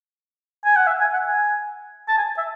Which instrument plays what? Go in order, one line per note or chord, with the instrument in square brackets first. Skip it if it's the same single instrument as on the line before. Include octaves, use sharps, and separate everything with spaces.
[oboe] G#5
F#5
E5
G#5
F#5
G#5
A5
G#5
E5